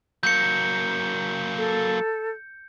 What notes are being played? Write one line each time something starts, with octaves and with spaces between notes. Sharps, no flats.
F#3 A#3 G6 C#7
A4